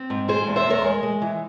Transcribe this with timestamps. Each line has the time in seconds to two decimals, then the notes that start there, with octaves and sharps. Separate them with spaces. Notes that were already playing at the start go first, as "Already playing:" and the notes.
Already playing: C4
0.10 G#2
0.28 G#3 G#4 C5
0.47 E2
0.56 C5 E5
0.66 E2 A#4 C#5
0.84 G#3
1.03 G#3
1.22 E3